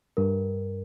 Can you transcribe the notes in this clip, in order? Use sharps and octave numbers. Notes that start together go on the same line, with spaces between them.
G2 A#4